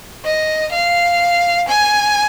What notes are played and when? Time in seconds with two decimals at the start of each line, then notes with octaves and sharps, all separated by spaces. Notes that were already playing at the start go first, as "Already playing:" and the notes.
0.24 D#5
0.72 F5
1.68 G#5